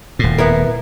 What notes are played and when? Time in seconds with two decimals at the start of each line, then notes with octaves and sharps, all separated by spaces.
0.19 D#1 A2
0.38 B3 E4 A#4